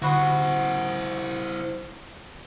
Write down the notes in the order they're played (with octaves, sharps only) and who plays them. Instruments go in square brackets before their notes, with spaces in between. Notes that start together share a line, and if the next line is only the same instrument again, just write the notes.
[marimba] D3 B5 [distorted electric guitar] E4 C5 [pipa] F#4